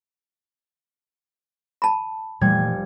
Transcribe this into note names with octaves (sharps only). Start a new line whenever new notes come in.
A5 B5
F1 A#2 E3 G3 A3 G#6